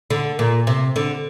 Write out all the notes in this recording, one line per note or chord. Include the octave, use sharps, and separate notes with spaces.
D3
A#2
C3
D3